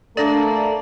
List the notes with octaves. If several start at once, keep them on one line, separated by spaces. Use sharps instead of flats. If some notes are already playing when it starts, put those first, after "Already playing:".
A3 A#3 D4 A4 D5